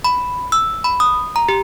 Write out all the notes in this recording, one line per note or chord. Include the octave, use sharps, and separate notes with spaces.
B5
E6
B5
D#6
A#5
G4